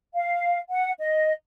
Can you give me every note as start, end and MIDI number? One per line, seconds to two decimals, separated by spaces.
0.15 0.59 77
0.70 0.91 78
0.99 1.33 75